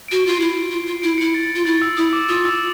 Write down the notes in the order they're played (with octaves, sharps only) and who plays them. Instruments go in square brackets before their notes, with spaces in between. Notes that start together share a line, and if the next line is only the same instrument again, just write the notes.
[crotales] D7
[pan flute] F#4
[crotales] D7
[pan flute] F4 [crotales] C7
[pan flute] E4
F4
F4
[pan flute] E4 [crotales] D7
[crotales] C#7
[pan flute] E4
[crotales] A6
[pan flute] F4
[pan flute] E4 [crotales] A6
[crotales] E6
[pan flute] E4 [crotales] D#6
[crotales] D6
[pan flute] F4 [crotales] D#6
[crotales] E6